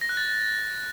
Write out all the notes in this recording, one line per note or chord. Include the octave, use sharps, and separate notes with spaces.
A#6
F#6
A6